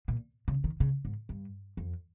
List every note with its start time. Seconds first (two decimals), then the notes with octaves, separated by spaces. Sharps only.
0.08 A#2
0.48 C#3
0.64 D#3
0.80 C#3
1.05 G#2
1.29 G2
1.77 F2